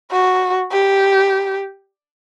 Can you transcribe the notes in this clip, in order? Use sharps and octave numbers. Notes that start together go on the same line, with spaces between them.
F#4
G4